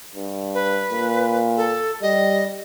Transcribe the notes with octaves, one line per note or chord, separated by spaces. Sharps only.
G2
B4
A#2
A4
G3 D#5